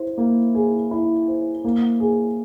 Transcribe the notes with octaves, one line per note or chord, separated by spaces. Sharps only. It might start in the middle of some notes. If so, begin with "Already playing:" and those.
Already playing: E4 C5
A#3
G#4
E4
C5
A#3
G#4